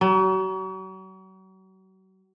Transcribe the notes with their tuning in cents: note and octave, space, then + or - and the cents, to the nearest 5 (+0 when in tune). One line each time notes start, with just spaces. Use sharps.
F#3 +40